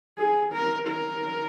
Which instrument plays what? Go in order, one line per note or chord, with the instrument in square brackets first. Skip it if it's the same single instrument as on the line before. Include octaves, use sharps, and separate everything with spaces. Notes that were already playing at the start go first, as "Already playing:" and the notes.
[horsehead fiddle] G#4
A#4
A#4